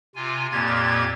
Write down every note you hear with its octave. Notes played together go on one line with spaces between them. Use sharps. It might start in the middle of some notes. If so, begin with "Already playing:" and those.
C3 F4 G#5
F2 A#2 A#3 G4 G#6 A6